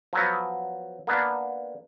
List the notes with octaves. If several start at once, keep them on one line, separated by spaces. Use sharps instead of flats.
F3 F#3 B3
A#3 B3 D4